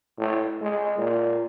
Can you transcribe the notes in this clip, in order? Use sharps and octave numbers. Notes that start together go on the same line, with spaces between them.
A2
G#3
A#2